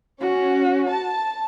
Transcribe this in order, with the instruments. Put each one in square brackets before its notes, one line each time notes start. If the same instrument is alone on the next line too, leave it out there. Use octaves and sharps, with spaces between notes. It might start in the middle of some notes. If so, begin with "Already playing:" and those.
[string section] C#4 [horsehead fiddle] F#4
[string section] A5